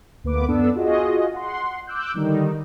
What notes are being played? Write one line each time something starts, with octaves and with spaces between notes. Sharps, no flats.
D2 A#3 B3 B4 D6
F#2 B3 D4 A4 E6
F4 F#4 G#4 D#5
F#5 C6
D6 E6 F#6 G6
D3 D#3 G3 D#4